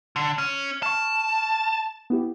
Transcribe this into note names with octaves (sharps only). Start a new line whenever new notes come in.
D3
C#4
A5 C#6 F6
B3 E4 G4